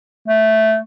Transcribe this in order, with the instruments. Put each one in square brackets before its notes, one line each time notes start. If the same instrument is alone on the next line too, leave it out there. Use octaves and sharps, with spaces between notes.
[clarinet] A3